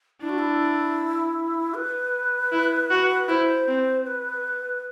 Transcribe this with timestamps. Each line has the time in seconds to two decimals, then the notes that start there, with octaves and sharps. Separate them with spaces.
0.21 D4 E4
0.29 F#4
0.38 E4
1.74 B4
2.52 E4
2.91 F#4
3.29 E4 C5
3.68 C4
4.06 B4